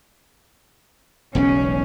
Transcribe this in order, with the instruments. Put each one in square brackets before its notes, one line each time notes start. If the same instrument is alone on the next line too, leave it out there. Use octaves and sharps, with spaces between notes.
[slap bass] E1 B1 C#3 [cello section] C#4